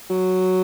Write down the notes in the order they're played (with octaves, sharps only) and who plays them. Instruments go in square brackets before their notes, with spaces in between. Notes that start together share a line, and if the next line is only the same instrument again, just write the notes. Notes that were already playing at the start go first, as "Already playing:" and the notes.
[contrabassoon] F#3